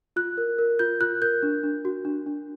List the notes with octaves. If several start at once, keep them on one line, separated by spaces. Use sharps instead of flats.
F4 F#6
A#4
A#4
F4 G6
F4 F#6
A#4 G6
D4
D4
F#4
D4
D4